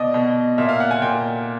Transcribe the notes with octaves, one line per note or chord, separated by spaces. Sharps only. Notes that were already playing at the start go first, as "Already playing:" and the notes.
Already playing: B2 D5 D#5
B2
A#2 E5
F5
F#5
G#5
A#2 G5